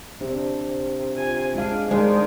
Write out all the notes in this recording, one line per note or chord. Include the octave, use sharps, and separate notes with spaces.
C3 D4
F4 G#5
G#3 D4 F5
D#3 G#3 D4 A#4 C5